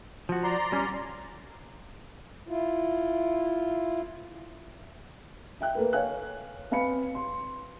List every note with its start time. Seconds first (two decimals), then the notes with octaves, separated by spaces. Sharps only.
0.29 F3 F#4
0.43 D5 A#5 C6
0.72 G3 C#4
2.47 E4 F4
5.61 E5 G5 F#6
5.75 A#3 A4 B4
5.93 C#5 F5 G#5 F#6
6.71 B3 C4 F5 G#5 B5 C#7
7.15 C6